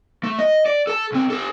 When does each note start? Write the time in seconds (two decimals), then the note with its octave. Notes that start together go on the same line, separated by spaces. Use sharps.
0.24 A3
0.39 D#5
0.66 D5
0.87 A4 A5
1.12 B1 C4
1.30 G4 A4